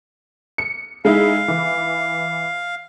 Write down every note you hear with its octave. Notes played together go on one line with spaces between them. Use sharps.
C#7
G#3 D#4 E4 F5
E3